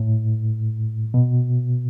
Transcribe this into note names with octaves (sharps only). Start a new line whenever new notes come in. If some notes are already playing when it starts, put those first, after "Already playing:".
Already playing: A2
B2